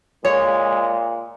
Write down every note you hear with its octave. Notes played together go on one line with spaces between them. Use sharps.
A#2 G#3 C#5